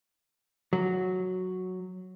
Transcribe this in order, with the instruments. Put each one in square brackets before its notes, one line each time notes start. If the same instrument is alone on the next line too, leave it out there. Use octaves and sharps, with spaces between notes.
[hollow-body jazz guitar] F#3